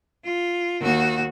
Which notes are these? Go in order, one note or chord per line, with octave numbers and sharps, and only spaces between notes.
F4
D#2 F#4